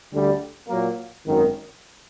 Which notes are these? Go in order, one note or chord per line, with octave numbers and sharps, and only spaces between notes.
D2 D3 G3
A#2 F#3 A#3
G#1 F#2 D#3